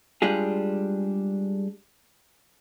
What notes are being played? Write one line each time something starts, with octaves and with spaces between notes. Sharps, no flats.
G3 G#3 D4 F4 G#4